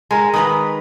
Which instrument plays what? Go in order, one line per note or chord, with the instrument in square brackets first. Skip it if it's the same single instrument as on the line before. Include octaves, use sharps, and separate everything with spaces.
[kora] G#3 A#4 [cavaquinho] G#5
[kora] D#3 B4 [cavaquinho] F5 B5 D#6